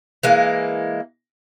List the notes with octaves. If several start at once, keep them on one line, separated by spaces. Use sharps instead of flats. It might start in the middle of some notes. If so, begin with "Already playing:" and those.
E3 G#3 A#3